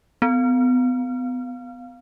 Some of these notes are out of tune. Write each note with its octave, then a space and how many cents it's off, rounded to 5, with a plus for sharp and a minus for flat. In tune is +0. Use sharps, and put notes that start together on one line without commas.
B3 +30